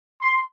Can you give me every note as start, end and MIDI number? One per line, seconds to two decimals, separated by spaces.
0.22 0.40 84